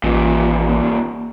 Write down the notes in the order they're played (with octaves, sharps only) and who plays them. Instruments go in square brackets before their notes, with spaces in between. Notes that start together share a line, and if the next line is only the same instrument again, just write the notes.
[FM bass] A1 [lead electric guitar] D#2 A#2